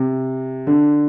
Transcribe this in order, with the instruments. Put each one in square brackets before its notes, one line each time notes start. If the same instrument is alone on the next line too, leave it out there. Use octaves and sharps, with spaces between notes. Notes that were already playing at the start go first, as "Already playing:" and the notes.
Already playing: [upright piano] C3
D3